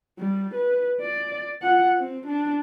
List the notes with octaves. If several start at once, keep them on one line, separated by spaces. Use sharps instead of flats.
G3
B4
D5
F4 F#5
C4
D4